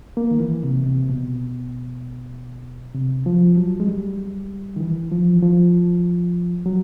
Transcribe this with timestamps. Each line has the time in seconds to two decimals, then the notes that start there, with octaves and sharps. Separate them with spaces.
0.17 A#3
0.31 D#3
0.40 E3
0.63 C3
0.86 C3
1.10 B2
2.95 C3
3.26 F3
3.57 F#3
3.80 G#3
3.88 G3
4.76 D#3
4.80 E3
5.12 F3
5.34 E3
5.42 F3
6.66 F#3